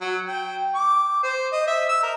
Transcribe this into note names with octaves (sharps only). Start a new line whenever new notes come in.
F#3
G5
D6
C5
D#5
E5
E6
A#4